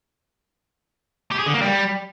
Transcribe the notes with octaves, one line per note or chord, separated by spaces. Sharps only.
G4
G#4
D3
A#3
G3